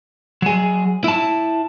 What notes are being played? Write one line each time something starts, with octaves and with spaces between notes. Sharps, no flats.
F#3 G#4
E4 A5